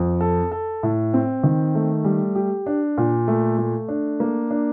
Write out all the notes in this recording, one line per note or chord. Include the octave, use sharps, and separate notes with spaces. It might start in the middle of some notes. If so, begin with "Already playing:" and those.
Already playing: F2
A4
A4
A2
C4
D#3
A3
G3
G4
D4
A#2
A3
A3
D4
A#3
D4